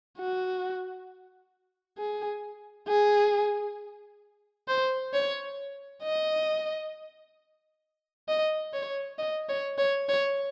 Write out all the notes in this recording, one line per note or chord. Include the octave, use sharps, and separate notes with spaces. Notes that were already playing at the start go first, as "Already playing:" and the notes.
F#4
G#4
G#4
C5
C#5
D#5
D#5
C#5
D#5
C#5
C#5
C#5